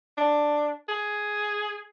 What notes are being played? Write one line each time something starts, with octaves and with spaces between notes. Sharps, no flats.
D4
G#4